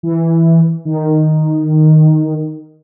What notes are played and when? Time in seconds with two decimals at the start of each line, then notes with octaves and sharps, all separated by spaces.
0.03 E3
0.85 D#3